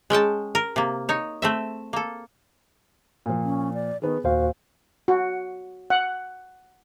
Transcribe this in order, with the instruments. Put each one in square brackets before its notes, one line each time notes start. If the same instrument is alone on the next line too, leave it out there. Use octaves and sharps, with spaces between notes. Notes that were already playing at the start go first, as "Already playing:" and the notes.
[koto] G#3 C#4 G5 A5
A#4
C3 A#3
D#4 C#5
A3 C4 E5
A#3 A4
[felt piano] A#2 F3
[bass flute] C#4
D5
[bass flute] D#3 [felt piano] B3 G#4
[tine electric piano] D#2 C5 F5 [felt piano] A#2 [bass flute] F#4
[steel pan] F#4
F#5